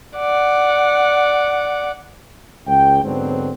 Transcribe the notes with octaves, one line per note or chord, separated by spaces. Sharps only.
D5 F#5
C#2 G5
G#2 D3 F#3 B3 C4 D4